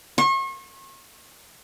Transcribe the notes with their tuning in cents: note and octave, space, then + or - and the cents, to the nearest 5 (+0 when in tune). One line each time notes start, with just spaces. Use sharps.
C#6 -40